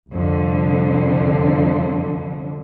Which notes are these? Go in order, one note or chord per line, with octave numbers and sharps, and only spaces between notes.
C2 F2 D3